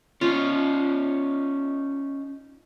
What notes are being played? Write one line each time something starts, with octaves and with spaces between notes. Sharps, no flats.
C#4 D#4 F4